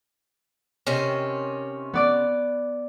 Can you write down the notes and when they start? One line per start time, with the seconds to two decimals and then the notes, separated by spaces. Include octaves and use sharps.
0.87 C3 D#3 C#4
1.94 B3 D5 D6